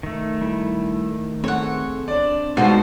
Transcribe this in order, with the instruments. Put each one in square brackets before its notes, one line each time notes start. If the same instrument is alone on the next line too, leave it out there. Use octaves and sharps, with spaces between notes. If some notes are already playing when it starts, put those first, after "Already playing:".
[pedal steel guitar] D#3 A3
[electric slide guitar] G3 E4 A4
[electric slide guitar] C4 G#4 A4 [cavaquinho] C#5 F#5
[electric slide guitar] C4 D4 [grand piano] D5
[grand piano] G#2 B2 [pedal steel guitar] G3 F4 [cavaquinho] F#4 A4 C5